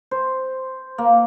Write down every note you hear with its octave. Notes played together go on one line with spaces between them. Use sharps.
C5
A#3